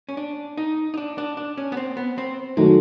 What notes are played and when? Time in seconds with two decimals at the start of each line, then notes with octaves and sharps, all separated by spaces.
0.09 C#4
0.17 D4
0.57 D#4
0.94 D#4
0.97 D4
1.18 D4
1.37 D4
1.58 C#4
1.72 B3
1.77 C4
1.97 B3
2.18 C4
2.57 D#3 F#3 G#3 A3